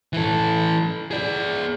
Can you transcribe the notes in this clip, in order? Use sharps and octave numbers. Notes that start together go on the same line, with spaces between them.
E3 A4
G#4 D5